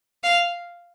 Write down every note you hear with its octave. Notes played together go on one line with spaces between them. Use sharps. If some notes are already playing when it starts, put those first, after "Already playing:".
F5